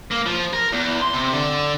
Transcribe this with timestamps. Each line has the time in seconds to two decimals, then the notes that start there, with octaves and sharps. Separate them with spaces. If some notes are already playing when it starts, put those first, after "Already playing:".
0.11 A#3
0.26 F3
0.53 A#4
0.73 E2
1.02 C6
1.14 C3
1.33 D3